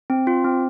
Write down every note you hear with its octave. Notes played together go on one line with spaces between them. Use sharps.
C4
F4
C4